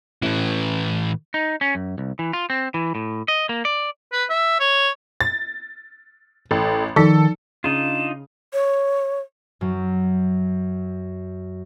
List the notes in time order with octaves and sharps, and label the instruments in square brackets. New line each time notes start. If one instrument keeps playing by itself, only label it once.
[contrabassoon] A1 [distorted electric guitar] A2 E3
[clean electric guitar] D#4
C#4
F#2
C2
E3
F4
C4
E3
A2
D#5
A#3
D5
[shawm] B4
E5
C#5
[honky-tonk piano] A6
[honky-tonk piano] A1 [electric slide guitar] A4 G5
[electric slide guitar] D#3 [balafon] F3 D#4 [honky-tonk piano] A4
[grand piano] C#3 [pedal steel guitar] D4 D#4 F4 [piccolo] E7
[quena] C#5
[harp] F#2 F#3